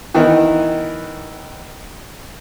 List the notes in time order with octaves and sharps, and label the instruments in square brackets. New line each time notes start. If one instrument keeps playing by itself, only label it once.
[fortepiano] D#3 E3 B3 D#4 E4